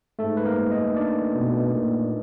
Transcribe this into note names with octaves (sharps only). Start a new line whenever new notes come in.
G#2 A3 A4
B4
A#3 A#4
D#4 D#5
D4 D5
B2
A#2